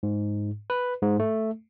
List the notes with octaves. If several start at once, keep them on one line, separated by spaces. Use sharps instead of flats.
G#2
B4
G#2
A3